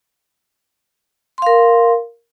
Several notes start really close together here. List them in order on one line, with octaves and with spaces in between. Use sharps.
C6 F5 A#4